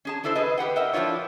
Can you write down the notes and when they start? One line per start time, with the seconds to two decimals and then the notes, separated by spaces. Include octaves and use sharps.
0.05 C#4 G#4 A5
0.23 C#4 D4 E4 A4 C5
0.35 G#4 B4 D#5
0.58 G4 B4 F#5 G5
0.76 A#4 D#5 E5 G5
0.93 F3 D4 E4 F4 C#5